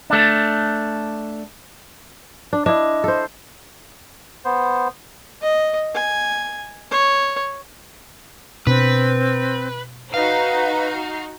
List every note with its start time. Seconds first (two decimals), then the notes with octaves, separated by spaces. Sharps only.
0.10 A3 D4
2.53 D4
2.66 D4 E4 D#5
3.04 A4 C5
4.45 B3 C5
5.42 D#5
5.95 G#5
6.91 C#5
8.67 B2 C4 D4 B4
10.14 D#4 F#4 B4 F5